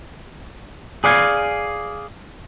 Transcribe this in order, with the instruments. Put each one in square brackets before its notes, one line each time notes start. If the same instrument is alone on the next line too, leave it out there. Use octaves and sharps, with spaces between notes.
[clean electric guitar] G#4 D5 F5 F#5 G#5